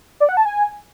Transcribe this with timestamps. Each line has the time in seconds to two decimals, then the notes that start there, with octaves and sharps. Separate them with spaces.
0.20 D5
0.29 F#5
0.37 A5
0.45 G#5